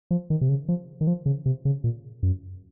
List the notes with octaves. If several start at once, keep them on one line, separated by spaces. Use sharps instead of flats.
F3
D#3
C3
C#3
F3
D#3
F3
C#3
C3
C#3
A#2
F#2